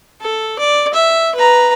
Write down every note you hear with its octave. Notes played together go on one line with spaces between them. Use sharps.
A4
D5
E5
B4 A#5